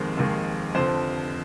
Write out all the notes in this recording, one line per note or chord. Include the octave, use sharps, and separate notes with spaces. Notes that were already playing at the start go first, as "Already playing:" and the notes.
Already playing: F1 D#2 D#3 G#3 C5
F1 D#2 D#3 G#3
F1 F2 D3 C5